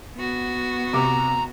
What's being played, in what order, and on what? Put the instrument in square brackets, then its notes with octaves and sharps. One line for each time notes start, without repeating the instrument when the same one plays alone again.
[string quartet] B3 F#4
[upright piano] C3 D6 [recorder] A#5